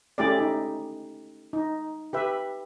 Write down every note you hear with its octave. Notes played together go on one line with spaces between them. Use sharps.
A3 C#4 E4 G4 G#4 D5
D#4
D#4
G4 B4 E5